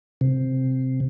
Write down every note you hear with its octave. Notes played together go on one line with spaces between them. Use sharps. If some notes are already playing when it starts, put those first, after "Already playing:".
C3